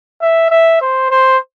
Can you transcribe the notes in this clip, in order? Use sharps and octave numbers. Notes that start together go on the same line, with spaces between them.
E5
E5
C5
C5